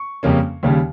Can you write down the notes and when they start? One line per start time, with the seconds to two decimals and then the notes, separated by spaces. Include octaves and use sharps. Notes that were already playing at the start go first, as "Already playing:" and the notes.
Already playing: C#6
0.23 F2 C#3 G3 A#3 C#4
0.63 D#2 C#3 G3